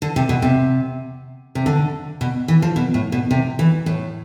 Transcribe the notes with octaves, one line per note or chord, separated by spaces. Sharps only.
D3
C3
B2
C3
C3
D3
B2
E3
F3
B2
A2
B2
C3
E3
A2